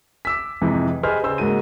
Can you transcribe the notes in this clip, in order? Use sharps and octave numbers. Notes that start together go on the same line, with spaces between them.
D6 E6 B6
F2 G#2 C3 E3
G4 G#4 B4 C5 D#5 F6
C#3 C5 E6
G#2 C#3 A#3 F#4 D#7